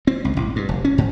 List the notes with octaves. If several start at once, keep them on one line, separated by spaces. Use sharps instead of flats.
C4
C#2
A1
G2
F1
C#4
G#2